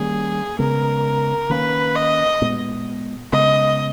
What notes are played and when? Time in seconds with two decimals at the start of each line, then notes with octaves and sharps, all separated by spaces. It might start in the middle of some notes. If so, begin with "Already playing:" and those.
Already playing: D#3 G3 A#3 C#4 G#4
0.59 C#3 G#3 B3 A#4
1.49 D#3 A#3 C#4 B4
1.96 D#5
2.42 A#2 G#3 B3
3.32 C#3 G#3 B3 D#5